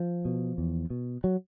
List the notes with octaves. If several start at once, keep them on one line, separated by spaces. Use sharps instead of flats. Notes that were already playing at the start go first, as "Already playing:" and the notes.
Already playing: F3
B2
E2
B2
F#3